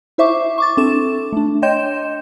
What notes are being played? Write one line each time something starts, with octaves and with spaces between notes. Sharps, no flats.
E4 C5 E5 C#6 D6
C#6 D6 A6
C4 D4 A4 E7
A3 D4
C#5 D#5 G5 C6 G6 E7